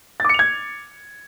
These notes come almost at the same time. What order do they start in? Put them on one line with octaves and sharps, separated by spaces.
A6 D6 C#7 F7 G#6